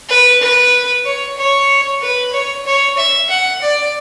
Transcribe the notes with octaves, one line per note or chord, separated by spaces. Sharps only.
B4
B4
C#5
C#5
B4
C#5
C#5
E5
F#5
D5